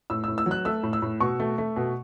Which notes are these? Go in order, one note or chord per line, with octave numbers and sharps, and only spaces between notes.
A2 E6
A2 E6
E6
F#3
F#6
A3 E6
A2
E6
A2
B2 C#6
A3
A3
B2